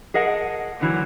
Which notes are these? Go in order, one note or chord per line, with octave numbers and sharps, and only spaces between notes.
G#4 A#4 D#5 F#5 A5
A#2 D3 E3 F#3